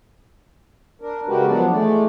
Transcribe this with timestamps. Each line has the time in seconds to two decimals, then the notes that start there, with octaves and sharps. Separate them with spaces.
1.02 D4 A#4
1.28 C#3 G#3 F#4 G4 A#4 B4
1.46 F3 F#3 B3 D4 D5
1.71 E3 G#3 A3 D5